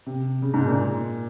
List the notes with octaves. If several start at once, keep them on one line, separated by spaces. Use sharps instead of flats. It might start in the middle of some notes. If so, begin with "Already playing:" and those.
C3
C#3
G#2
A#2